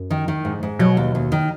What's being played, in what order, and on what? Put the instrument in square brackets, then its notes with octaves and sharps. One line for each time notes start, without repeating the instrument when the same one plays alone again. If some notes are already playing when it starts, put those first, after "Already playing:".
Already playing: [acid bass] F#2
[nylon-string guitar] D#3
D#3
G#2
G#2
[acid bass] B2 [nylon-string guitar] F#3
[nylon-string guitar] D#2
D#2
D#3